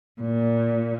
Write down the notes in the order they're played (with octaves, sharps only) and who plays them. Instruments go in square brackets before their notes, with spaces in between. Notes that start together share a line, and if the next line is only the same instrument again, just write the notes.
[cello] A#2